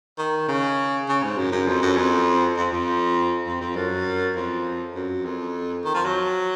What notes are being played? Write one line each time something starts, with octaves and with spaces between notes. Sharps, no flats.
D#3
C#3
C#3
G#2
F#2
F#2
F2
F#2
F2
F2
F2
F2
F2
F#2
F2
F#2
F2
D#3
F3
F#3